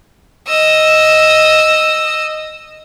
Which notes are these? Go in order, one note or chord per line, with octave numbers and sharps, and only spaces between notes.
D#5 E6